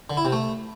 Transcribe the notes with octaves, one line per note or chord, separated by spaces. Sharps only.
D3
E4
C3
A3